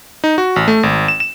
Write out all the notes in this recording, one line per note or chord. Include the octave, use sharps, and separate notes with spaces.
D#4
F#4
A1
A3
G#1
E7
E7